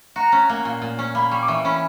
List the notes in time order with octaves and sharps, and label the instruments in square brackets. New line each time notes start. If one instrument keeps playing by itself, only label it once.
[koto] F#4 [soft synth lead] A#5
[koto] C#4
A#3
A#2
A#2
C#4
[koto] A#3 [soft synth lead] B5
[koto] G3 [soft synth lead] C#6
[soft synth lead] D6
[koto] E3 [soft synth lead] C#6
[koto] C#4 [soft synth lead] B5